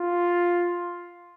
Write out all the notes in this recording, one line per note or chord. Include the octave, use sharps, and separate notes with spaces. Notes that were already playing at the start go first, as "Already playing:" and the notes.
Already playing: F4